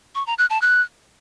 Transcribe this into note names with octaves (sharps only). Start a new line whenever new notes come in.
C#6
A#5
F#6
A5
F#6